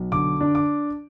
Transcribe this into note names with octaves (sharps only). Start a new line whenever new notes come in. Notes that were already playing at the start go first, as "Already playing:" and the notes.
Already playing: B1
D3 D6
D4
D6